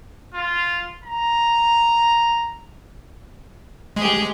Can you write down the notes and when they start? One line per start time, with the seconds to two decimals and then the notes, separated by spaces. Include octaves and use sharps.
0.34 F4
1.05 A#5
3.96 G#3 G4 G#4